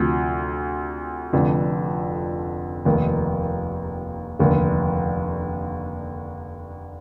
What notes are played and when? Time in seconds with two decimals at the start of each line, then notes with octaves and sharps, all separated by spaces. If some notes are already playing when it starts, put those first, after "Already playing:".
Already playing: D2 C3 F3
1.33 F1 F2 D3 F3
2.85 F1 D#2 D#3
4.39 F1 D#2 D3